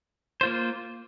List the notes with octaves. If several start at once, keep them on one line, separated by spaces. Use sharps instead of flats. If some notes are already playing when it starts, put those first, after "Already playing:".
A#3 F4 C5